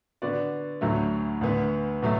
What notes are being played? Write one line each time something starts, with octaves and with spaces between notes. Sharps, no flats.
D3 B3 F#4 D5
D2 D3 F#3 A3
D2 D3 B3
B2 F#3 A3